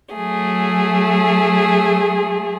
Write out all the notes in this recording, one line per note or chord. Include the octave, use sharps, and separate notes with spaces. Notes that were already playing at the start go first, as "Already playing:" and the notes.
F#3 A3 G#4